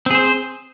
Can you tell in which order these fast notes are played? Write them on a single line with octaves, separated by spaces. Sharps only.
C4 G#4 C5